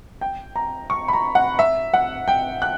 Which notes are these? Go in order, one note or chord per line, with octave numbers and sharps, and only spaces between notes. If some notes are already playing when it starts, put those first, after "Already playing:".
G5
A#5
C#6
B5
A#5
F#5
E5
F#5
G5
F#6